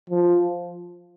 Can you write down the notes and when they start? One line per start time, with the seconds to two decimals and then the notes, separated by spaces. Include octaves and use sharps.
0.10 F3